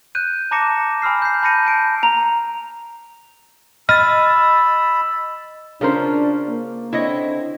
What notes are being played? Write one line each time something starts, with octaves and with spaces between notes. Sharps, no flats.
F#6 G6 D#7
A5 A#5 D6 A#6 C#7 E7
G#5 B5 E6 F6 C7
G6 C7
A5 B5 G6 A#6 C#7 D#7
A5 G6 D7
A#5
D#5 B5 E6 F6 A6
C#3 C#4 D4 F4 A#4 C5
A#3
D3 C4 D4 E4 C#5 D#5